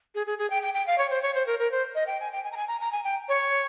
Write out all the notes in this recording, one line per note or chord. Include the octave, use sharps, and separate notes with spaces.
G#4
G#4
G#4
G5
G5
G5
F5
C#5
C5
C#5
C5
A#4
A#4
C5
D#5
G5
G#5
G5
G#5
A#5
G#5
A#5
A#5
G#5
G5
C#5